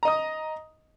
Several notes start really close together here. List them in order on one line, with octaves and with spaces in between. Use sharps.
A#5 D#5 D#6